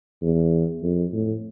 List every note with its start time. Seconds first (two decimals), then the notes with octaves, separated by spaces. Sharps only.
0.22 E2
0.83 F2
1.13 A2